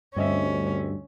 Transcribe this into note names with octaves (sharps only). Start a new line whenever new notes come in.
D2 G2 C4 C#4 D#5 E5